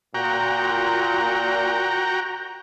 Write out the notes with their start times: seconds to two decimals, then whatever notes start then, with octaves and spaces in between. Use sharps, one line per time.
0.14 A#2 F#4 G5 A#5